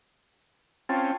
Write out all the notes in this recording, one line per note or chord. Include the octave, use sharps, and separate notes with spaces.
C4 C#4 F4 G5 A5 A6